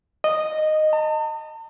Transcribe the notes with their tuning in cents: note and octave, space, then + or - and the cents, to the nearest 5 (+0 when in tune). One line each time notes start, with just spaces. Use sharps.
D#5 -10
A5 +45